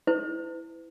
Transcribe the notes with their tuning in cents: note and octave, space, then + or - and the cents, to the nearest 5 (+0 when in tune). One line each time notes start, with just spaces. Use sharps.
E4 +0 B4 +35